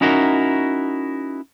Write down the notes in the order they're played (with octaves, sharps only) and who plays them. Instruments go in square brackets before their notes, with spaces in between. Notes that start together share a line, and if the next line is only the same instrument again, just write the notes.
[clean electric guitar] C#4 D#4 E4 F#4 A#4